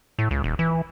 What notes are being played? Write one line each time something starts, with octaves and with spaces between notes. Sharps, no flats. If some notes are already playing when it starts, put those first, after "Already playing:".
A2
C#2
D#1
E3